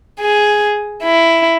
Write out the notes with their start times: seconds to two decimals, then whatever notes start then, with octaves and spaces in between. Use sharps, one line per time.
0.20 G#4
1.03 E4